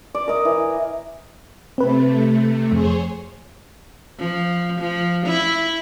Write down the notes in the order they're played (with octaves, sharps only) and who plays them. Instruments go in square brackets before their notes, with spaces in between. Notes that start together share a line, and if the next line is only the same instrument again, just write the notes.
[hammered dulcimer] D5
A#4 D#5
E3
[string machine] C3 A3 [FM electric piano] C4 B4
[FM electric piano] F2 [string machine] G#4 C5 C#5
[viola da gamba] F3
F3
E4